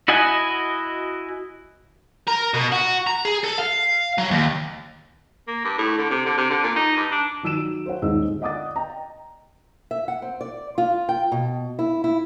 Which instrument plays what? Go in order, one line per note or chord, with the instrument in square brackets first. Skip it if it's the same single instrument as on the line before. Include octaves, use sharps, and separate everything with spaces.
[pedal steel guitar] E4 F#4 D#5 F#5 G#5
[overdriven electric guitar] A#4
B2
F#4
A#5
G#4
A4
F5
F#3
D#2
[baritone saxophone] A#3
G2
A2
D3
C3
D3
C3
D3
A#2
D#4
G2
D4
[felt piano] D#3 F#3 E6 D7 E7
C5 C#5 F#5
D#1 G#2 D#4 G#4 D#5 E6
D3
D5 D#5 F#5 D6 D#6 A6
D#5 G5 A#5
[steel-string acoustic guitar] E5
F#5
C4
D5
F4
G5
B2
E4
E4